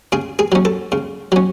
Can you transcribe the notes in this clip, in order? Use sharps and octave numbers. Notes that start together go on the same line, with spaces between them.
C#3 G#4
G#4
F#3 C#4
A4
C#3
F#3 C#4